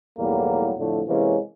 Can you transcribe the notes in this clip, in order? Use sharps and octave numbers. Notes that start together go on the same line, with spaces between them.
B1 E2 A2 F#3 G3 A#3
F2 A2 D3 F3 A3
C3 E3 G#3 A#3 C#4